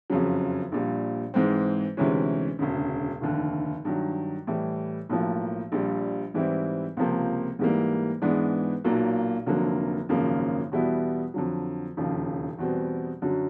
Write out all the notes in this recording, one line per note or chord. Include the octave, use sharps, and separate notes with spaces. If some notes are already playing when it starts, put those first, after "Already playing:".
F#1 F2 C#3 F#3
A#1 A#2 G3
G#2 E3 G#3 C4
D2 C3 E3 G#3 C#4
E1 D2 C#3
F1 D#2 D3
G2 D#3 F#3
A2 E3 G3
B1 A2 F3 A#3
A#1 A#2 G3
G#2 E3 G3 C4 E4
C#2 C3 F3 A#3
G#2 E3 G3 A#3
G#2 E3 G#3 B3 D4
B1 A#2 F#3 A#3
F1 F2 D3 F#3 A#3
G#1 F#2 C#3 F3 A#3
E2 B2 G3 B3 E4
F2 D3 F#3
E1 D#2 C#3 F3
E2 B2 G3 C4
F#2 D3 F#3